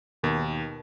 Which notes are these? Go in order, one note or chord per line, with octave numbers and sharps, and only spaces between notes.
D#2 B2 D#3